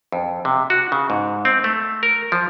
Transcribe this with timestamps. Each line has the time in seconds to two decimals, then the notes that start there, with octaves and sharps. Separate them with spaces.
0.12 F2
0.45 C3
0.70 F#4
0.92 C#3
1.10 G#2
1.45 C4
1.64 A3
2.03 A#4
2.32 F3